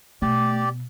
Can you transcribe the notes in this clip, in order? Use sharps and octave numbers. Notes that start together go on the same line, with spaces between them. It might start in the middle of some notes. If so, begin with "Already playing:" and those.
B2 A3 G4 D5